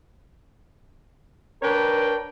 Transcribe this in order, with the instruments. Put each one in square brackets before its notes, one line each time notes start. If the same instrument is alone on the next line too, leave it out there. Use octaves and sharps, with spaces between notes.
[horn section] D4 A#4 B4 C#5 G5